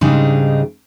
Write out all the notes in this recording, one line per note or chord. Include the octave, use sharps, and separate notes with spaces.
G#2 C#3 G3 G#3 D4 D#4